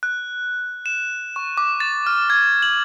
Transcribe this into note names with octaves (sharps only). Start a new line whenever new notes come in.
F#6
E7
C#6
D6
A6
F6
G#6
F#7